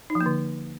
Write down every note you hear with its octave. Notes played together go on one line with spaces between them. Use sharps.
D#4
F3
A#3
D3